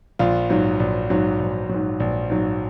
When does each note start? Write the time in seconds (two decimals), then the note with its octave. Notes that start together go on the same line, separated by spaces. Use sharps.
0.19 A#1 F4
0.50 G#2 F#3
0.80 A#1
1.10 G#2 F#3
1.40 A#1
1.69 G#2 F#3
2.00 A#1
2.30 G#2 F#3